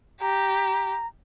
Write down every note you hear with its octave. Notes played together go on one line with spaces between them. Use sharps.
G4 A#5